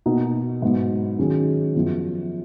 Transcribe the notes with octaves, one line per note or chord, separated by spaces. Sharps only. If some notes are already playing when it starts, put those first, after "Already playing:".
B2 A#3 D#4 F#4
G#2 F#3 B3
D#3 F#3 C#4 G#4
F#2 F3 B3